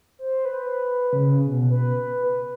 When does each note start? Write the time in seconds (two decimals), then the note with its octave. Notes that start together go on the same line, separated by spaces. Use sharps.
0.19 C5
0.45 B4
1.13 C#3
1.46 B2
1.71 B4